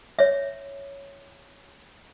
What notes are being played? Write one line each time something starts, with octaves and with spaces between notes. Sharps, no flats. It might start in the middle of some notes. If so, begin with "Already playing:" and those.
C#5 E5